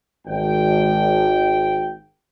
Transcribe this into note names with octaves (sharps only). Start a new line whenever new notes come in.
G#1 G5